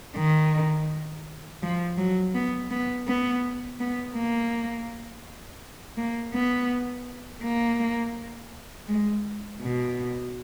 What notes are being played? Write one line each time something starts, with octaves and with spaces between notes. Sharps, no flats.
D#3
F3
F#3
B3
B3
B3
B3
A#3
A#3
B3
A#3
G#3
B2